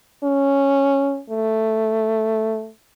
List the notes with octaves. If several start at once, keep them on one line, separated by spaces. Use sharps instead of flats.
C#4
A3